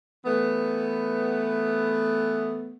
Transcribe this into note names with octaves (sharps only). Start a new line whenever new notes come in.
E3 A3 B3